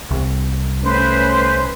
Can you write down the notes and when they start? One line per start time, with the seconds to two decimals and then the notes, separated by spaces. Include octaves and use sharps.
0.11 C2
0.82 A3 C#4 B4 C5